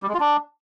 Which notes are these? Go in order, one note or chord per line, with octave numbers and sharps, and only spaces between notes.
G3
G#3
F4
D4